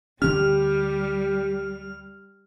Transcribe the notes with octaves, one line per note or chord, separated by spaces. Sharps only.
D2 D3 G3 C#4 G4 F6